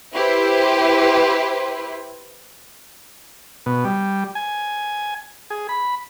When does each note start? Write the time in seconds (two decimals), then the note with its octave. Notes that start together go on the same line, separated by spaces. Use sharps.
0.13 E4 G4 B4 C5
3.66 B2
3.85 G3
4.35 G#5
5.50 G#4
5.69 B5